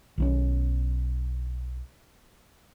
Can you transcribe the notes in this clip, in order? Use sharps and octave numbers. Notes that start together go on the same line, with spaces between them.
B1 F#3 C#4